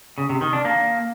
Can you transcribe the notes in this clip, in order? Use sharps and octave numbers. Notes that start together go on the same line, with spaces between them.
C#3
C3
D#3
D4
A#3